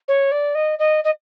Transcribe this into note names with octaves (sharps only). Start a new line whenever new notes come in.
C#5
D5
D#5
D#5
D#5